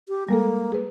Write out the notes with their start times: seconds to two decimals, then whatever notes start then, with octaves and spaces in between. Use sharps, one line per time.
0.08 G4
0.29 G3 G#3 A#3 A4
0.72 G#4 B4